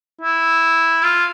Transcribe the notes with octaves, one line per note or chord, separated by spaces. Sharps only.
E4
F4